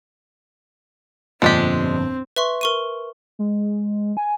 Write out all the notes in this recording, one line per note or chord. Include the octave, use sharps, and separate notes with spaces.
G1 F2 A#2 G#3 C4 D4 G4
B4 E5 C6 C#6
A#4 C#6 D#7
G#3
G#5